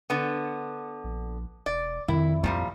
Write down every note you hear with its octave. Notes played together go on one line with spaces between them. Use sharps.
D3 B3
A#1
E1 D5
F2 D#3 E4
A#2 F3 G3 E4